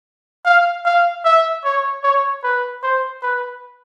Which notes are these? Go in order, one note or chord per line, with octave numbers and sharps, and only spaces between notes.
F5
F5
E5
C#5
C#5
B4
C5
B4